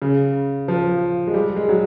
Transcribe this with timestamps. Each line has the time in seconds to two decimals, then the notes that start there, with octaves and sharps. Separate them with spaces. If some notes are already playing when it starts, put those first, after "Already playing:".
0.02 C#3
0.68 F3
1.27 G#3
1.34 G3
1.56 G#3
1.69 F#3